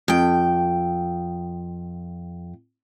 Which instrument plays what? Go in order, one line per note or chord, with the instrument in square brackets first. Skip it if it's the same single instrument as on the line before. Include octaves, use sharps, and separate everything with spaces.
[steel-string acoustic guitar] F2 G5